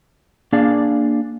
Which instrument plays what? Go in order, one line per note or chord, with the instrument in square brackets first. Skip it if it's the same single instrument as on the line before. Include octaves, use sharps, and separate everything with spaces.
[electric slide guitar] A#3 D4 G#4 D5 F5